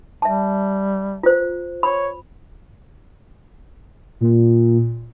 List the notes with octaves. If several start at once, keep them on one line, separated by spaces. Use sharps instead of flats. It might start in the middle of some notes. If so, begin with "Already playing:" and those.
G3 E5 A5
F4 C5
C#5 B5
A#2